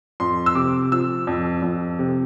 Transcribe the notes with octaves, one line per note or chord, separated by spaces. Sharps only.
F2 C6
E6
C3 D6
F3 E6
F2
F2
C3